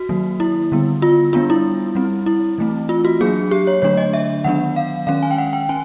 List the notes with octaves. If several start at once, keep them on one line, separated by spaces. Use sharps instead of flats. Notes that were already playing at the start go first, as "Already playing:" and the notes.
Already playing: F#4
D#3 F#3 A#3
E4
D3 G3 B3
F4
G3 B3 D4 F4
E4
G3 C4
E4
E3 A3 C4
F4
F#4
F#3 A#3 D4 G#4
G4
C#5
D3 F#3 A3 D4 C#5
D#5
E5
D#3 F#3 B3 D4 F#5
F5
D#3 G#3 C#4 F5
G#5
G5
F#5
G5
C#4 G#5